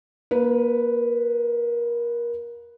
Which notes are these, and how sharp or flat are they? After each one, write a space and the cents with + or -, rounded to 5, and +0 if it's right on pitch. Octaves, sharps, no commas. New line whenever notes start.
A#3 +25 B4 +0